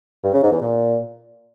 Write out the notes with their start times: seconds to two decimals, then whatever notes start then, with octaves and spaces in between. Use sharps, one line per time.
0.24 G2
0.33 C#3
0.43 G#2
0.52 E2
0.61 A#2